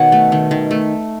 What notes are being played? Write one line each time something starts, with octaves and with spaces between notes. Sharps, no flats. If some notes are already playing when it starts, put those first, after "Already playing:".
Already playing: B2 D#3 B3 C#5 F#5
A3
D#3
D#3
A3